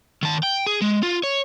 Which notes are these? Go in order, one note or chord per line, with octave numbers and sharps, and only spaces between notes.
D#3 A5
G5
G#4
G#3
F4
C#5